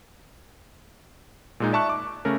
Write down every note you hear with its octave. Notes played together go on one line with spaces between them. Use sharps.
A#2 G#3 D#4
D5 E5 A5 C#6 F#6
D6
C#3 A3 C#4 A#4